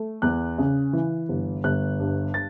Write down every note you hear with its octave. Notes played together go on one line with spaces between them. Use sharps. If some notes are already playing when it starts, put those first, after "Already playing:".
Already playing: A3
E2 F#6
C#3
E3
G1
G1 F#6
G2
A6